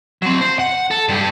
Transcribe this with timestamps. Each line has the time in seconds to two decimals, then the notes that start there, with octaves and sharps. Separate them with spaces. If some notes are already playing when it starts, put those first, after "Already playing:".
0.22 F#3 C4
0.41 C5
0.59 F#5
0.91 A4
1.08 G2 G4